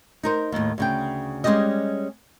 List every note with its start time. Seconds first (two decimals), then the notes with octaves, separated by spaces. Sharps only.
0.23 D#4 A#4 C5
0.52 D#2 A2
0.78 D2 C#3 G5
1.44 G3 G#3 C#4 F4 G4 D#5